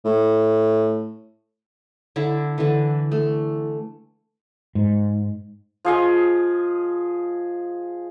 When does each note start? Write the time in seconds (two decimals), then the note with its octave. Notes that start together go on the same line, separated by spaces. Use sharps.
0.05 A2
2.16 D3 E4 A#5
2.58 D3 E3
3.11 A3
4.75 G#2
5.85 F3 G#4 D#5